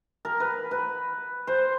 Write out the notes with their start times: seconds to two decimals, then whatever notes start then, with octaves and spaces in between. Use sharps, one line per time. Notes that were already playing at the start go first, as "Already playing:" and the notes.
0.25 A#4
0.40 B4
0.71 B4
1.47 C5